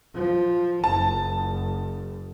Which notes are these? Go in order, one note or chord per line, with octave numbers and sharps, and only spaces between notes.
F3
F#1 A5